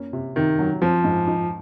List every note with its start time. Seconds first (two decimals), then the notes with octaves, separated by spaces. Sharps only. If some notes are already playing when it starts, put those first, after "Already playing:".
Already playing: A#3 C#4
0.13 C3
0.36 C3 D#3
0.59 F#3
0.82 F3 C4
1.04 G#2
1.27 D#4